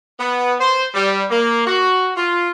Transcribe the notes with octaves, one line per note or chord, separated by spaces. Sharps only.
B3
C5
G3
A#3
F#4
F4